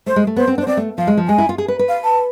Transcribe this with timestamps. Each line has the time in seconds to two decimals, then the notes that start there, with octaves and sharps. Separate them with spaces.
0.06 A3 C5
0.16 G#3
0.27 A3
0.36 B3 C5
0.47 C4
0.58 D4 C5
0.67 C4 D5
0.77 A3
0.98 F3 F5
1.07 G#3
1.17 F3
1.28 G#3 G#5
1.38 E4
1.49 F4
1.58 G#4
1.68 B4
1.79 B4
1.89 F5
2.04 A5